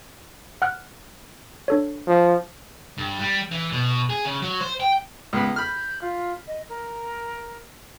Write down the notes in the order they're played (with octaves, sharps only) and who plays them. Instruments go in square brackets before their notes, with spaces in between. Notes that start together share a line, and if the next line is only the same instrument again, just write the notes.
[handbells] F#5 F6 F#6
D4 A4 C#5
[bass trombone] F3
[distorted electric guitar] G2
G3
E3
B2
G#4
C#3
F#3
C5
G5
[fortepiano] C#2 B3 B5 [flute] D#6
[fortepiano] B5 F6 [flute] G6
[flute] F4
D#5
A#4